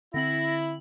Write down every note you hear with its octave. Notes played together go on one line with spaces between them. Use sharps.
D3 C4 E4 A#6 F#7